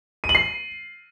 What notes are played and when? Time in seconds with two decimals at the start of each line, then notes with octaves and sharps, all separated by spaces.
0.24 D#7
0.29 F#7
0.35 C7